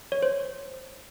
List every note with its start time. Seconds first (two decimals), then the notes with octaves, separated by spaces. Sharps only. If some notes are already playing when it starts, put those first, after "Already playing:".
0.12 C#5
0.22 C5